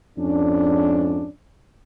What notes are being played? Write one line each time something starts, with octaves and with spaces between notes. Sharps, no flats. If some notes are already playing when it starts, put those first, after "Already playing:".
F2 G#2 C#4 D4